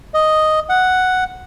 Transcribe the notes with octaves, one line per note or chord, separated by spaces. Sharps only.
D#5
F#5